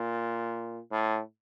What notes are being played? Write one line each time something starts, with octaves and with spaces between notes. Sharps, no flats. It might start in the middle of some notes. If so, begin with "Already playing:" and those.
Already playing: A#2
A2